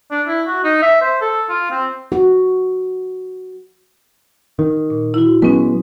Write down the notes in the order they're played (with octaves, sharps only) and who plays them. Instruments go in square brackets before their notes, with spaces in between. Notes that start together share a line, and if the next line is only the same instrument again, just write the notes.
[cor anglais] D4
E4
F#4
D#4
E5
C5
A4
F4
C4
[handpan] F#4
[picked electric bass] D#3
[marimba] A#2
E4 F#4
[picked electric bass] F#3 G#3 B3 [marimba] C#4 B4